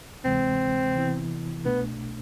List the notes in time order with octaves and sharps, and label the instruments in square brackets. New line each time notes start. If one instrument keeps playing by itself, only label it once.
[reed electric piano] D2 C3 E3 G#3 [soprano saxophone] C4
[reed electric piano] C3 E3 B3 E4
[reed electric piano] C2 B2 A3 D4 [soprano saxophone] B3